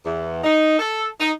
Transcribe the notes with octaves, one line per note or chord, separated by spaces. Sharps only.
E2
D#4
A4
D#4